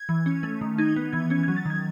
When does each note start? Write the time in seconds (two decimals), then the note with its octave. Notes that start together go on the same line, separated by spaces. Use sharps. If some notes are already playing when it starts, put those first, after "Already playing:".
Already playing: G#6
0.09 E3
0.26 C#4
0.43 A3
0.61 D#3
0.78 D#4 G#6
0.96 B3
1.13 E3 G#6
1.30 C#4 G#6
1.43 G#6
1.48 F#3
1.56 A6
1.65 D#3 G#6